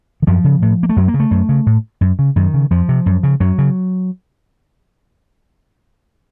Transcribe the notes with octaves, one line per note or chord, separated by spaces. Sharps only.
D#3
F#2 F3
C#3
A2
A#3
A3
F#2 F#3
A#3
C#3
A3
F#2
C#3
A2
F#2
C#3
F#2 D#3
C#3
F2 F3
C3
F#2
C#3
F#2 F#3
C#3